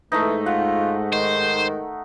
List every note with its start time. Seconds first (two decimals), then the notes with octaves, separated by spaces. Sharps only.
0.12 G#2 E3 A3 D#4
0.46 F4 F#5
1.13 D#3 C5